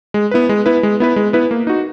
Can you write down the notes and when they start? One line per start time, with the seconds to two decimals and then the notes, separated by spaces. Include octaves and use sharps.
0.14 G#3
0.31 B3 E4 B4
0.49 G#3
0.66 B3 E4 B4
0.83 G#3
1.00 B3 E4 B4
1.16 G#3
1.33 B3 E4 B4
1.51 A#3
1.67 D#4 F#4